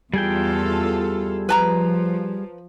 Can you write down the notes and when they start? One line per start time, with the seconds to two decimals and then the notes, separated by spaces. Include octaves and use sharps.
0.13 E2 G3 F4 G#4 A4 G5
1.49 F3 B4 A5 A#5